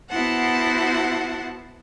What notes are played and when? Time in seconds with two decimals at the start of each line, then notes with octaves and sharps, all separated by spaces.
0.10 B3 E4 F#4 C5 F#5 A5